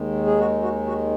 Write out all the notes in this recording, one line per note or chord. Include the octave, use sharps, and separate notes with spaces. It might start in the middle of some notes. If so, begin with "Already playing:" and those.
Already playing: D#2 D#3 G#3
G#4
F#4
F#4
F#4